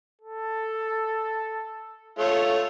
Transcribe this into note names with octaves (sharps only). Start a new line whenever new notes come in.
A4
A3 F4 C#5